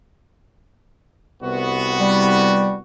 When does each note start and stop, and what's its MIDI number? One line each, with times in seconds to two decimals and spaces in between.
1.42 2.82 36
1.42 2.82 59
1.42 2.82 66
2.00 2.76 55